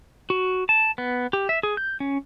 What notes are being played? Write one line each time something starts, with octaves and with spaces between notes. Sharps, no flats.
F#4
A5
B3
G4
E5
G#4
G6
C#4